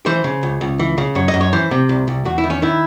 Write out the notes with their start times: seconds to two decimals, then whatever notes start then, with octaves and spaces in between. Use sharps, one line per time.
0.06 E3 C5
0.24 C#3
0.43 C#2
0.61 C#2
0.79 E3
0.98 C#3
1.15 F#2 C#5
1.28 D#5
1.34 F#2
1.41 C#5
1.53 E3 C5
1.71 C3
1.89 C2
2.08 C2
2.25 E2 F#4
2.38 E4
2.44 D#3
2.50 C#4
2.62 D#3 E4